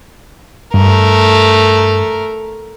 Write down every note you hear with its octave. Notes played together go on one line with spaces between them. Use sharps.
G2 A3 A#4